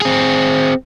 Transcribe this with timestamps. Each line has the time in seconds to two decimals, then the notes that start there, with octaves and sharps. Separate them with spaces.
0.02 C4 G#4